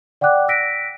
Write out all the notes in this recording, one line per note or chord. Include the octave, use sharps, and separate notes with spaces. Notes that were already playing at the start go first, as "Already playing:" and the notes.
D5 F#5 G5 D6 F#6
E6 F#6 A#6 B6 D7